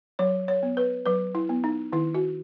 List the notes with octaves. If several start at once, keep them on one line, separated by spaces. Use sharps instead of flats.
F#3 C#5
C#5
B3
B4
F#3 B4
E4
B3
D#4
D#3 E4
F#4